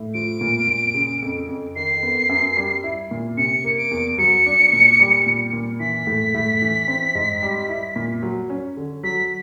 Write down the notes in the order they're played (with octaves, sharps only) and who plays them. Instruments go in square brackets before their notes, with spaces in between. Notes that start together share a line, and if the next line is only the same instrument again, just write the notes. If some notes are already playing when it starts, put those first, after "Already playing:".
Already playing: [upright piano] A2
[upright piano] F3 [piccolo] D7
[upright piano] A#2
A#2
C#3
F2
F2
[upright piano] D#3 [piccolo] C7
[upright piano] B3
F#2
G3
E4
A#2
[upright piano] C3 [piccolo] C#7
[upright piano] A#3
[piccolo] D7
[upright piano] E2
[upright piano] F#3 [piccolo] C#7
[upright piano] D4
A#2
G3
A#2
A#2
[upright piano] E3 [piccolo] B6
[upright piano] A2
A2
E3
C4
G#2
G3
E4
A#2
F#3
C#4
D3
[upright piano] F#3 [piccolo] B6